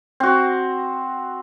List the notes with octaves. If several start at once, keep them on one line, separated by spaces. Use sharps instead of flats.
C4 F#4